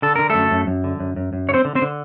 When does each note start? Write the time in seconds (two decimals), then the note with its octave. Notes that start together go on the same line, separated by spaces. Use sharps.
0.02 D3 A4
0.16 D3 A#4
0.30 F#2 A3 A4
0.51 F#2
0.67 F#2
0.84 D3
1.00 F#2
1.16 F#2
1.33 F#2
1.49 D3 C#5
1.54 C4 C5
1.65 D3
1.75 C4 C5
1.82 D3